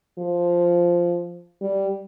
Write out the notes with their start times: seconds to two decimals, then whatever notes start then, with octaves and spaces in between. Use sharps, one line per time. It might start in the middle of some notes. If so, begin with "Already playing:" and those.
0.19 F3
1.62 G3